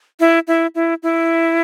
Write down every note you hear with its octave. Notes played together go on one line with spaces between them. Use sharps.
E4
E4
E4
E4